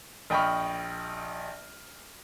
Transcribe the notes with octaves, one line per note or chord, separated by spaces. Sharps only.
A#1 D#5 G5 B5 C#6 F6